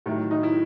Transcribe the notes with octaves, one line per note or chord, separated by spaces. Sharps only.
A2 D#3 F#3
D#4
E4